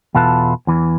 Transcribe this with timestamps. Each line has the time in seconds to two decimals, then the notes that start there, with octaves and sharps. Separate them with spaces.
0.15 E2 B2 F4 A4 B4 A5
0.67 E2 E3